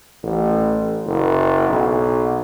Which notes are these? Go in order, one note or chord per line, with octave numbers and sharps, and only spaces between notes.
A1
F#1
B1